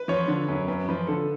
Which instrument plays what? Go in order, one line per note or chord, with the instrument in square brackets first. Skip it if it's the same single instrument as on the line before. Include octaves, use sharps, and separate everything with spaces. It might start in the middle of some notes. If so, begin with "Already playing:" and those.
Already playing: [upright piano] B4
[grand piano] F3 [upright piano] C#5
[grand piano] D3
F#2
[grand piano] F#2 [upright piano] B4
[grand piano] F3 [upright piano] B4
[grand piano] D3 [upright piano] A4